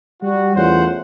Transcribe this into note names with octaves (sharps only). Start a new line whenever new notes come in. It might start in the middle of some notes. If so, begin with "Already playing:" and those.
G3 F#4
E2 A3 C#4 F4 C5 F#5